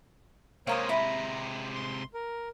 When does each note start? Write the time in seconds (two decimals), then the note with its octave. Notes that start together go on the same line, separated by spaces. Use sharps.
0.67 C3 G#3 A#3 C5 C#5 F5 A#5 D#6
0.89 E4 A#5 B5
1.75 C6
2.14 A#4